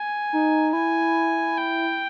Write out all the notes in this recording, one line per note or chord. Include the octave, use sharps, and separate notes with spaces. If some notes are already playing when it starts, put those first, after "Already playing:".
Already playing: G#5
D#4
E4 G#5
G5